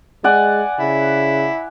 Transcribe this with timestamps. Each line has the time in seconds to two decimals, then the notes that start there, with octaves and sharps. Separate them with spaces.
0.24 G#3 D5 F#5 G#5
0.80 C#3 E4